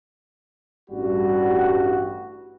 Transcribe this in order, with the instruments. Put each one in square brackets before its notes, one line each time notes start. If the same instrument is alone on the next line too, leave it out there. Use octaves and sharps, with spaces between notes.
[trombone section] A1 G2 G3 F#4